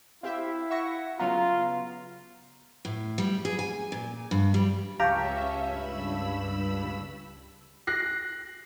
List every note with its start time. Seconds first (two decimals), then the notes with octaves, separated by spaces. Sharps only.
0.23 C4 E4 G4 E5 F5
0.71 E5 F#5 C#6 A#6
1.19 C#3 F#3 B3 F4 A#5
2.85 A2
3.18 G3
3.45 G#4
3.59 G#5
3.92 A#2
4.31 G2
4.54 G3
5.00 C#2 C#4 G4 E5 F5 A5 A#5 C#6
5.66 G2 B5 E6
7.87 F#6 A#6 C7